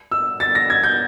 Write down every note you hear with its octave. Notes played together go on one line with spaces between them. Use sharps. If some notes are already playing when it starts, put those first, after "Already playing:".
E6
A6
A#6
G#6
G6